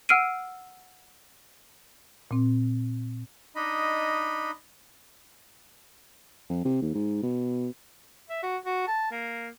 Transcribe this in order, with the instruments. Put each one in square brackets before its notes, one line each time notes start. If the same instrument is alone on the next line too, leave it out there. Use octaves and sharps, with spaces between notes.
[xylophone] F#5 E6 F6 C7 D7 D#7
[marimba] A#2 C4
[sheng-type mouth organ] D4 D#4 D#5 B5
[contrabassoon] F2
C3
D#2
G#2
B2
[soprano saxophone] E5
F#4
F#4
A5
A#3